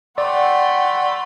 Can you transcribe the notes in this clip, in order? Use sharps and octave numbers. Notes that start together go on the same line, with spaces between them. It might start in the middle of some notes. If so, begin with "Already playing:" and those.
A3 D5 F#5 G5 B5 C6